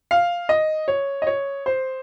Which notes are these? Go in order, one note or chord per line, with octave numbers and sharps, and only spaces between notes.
F5
D#5
C#5
D#5
C#5
C5